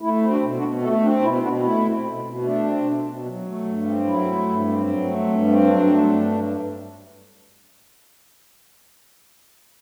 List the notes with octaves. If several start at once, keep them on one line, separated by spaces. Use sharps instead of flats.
A3 E4
C4
D4 F#4
B2
D4 F#4
B2
A3 F#4 A4
C4 D4
B2 E4
B2 D4 F#4
A3 E4
C4
B2
B2
A3 D4
C4
B2
B2
F#3
A3
G2
C4
F#3 E4
A3
G2
C4
F#3
A3
G2
C4
F#3 D4
A3
G2